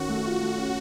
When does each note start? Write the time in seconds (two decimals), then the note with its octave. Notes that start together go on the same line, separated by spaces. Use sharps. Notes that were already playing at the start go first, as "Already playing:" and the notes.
Already playing: D#3 C#4 F#4
0.09 A3
0.25 F4
0.41 A3
0.58 C#4